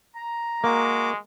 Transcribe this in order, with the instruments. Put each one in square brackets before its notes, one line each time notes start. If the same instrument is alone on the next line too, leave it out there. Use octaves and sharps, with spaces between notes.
[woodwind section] A#5
[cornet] G#3 [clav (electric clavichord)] A#3 [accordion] F#4 D6